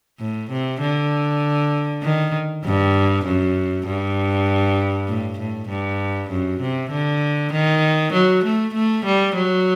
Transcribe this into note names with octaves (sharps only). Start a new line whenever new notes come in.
A2
C3
D3
D#3
G2
F#2
G2
A2
A2
G2
F#2
C3
D3
D#3
F#3
A3
A3
G3
F#3